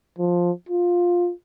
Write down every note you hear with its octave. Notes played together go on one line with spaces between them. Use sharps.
F3
F4